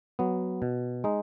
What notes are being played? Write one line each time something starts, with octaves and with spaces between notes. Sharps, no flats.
F#3 B3
B2
G#3 D#4